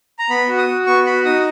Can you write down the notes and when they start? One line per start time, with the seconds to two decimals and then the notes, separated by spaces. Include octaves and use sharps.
0.19 A#5
0.30 B3 B5
0.49 F#4
0.58 D#6
0.68 F#4
0.86 B3 C#6
1.06 F#4 B5
1.25 D#4 D#6